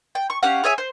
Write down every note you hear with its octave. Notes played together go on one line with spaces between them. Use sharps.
G5
C#6
C#4 G4 F5 F#5
G#4 C#5 E5 G#5
C5